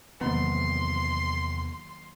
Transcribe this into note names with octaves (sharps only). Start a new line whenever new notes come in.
E2 C3 D#3 F#3 A#3 B3 C6